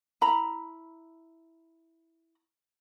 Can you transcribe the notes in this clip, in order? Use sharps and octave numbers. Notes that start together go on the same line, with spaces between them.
E4 A#5 B5